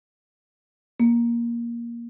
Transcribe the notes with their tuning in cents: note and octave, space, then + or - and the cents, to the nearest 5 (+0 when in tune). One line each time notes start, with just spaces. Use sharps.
A#3 +15